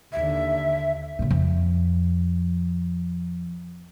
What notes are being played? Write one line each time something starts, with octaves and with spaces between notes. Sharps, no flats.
D#2 D3 E5
C#2 A#2
F2